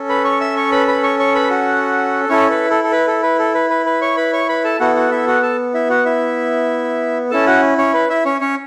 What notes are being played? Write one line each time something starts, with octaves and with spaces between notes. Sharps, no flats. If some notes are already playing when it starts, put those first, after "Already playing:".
Already playing: C#4 A4
B4 B5
C#5 C#6
E5 E6
C#5 C#6
B4 B5
B4 B5
C#5 C#6
C#5 C#6
B4 B5
F#4 F#5
C#4 E4 A4 C#5
B4
A4
A4
B4
A4
B4
A4
B4
B4
B4
C#5 C#6
B4 B5
C#5 C#6
B4 B5
A4 A5
B3 E4 F#4 A4 F#5
F#4 F#5
E4 E5
F#4 F#5
A4 A5
E4 E5
F#4 F#5
E4 E5
C#4 E4 A4 A5
F#4 F#5
C#4 C#5
B4
E4 E5
C#4 C#5
C#4 C#5